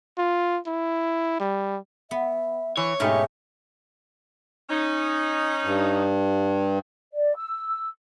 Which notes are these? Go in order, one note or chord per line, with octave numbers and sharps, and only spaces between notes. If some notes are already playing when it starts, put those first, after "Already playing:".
F4
E4
G3
B3 E5
E3 C#5
G#2 B2 A3 C#4 D#4 G4 E5
C#4 D#4
G2
D5
E6